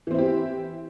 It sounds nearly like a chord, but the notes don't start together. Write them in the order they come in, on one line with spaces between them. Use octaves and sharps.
E3 C4 E4 G4